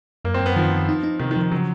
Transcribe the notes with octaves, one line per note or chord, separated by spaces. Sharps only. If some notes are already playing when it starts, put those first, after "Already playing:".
F#2 A#3
C4
F#2
B3
D#3 F3
D#3
D#4
D#4
C3 D#3
D#3
F3
D#3
C#3 F#3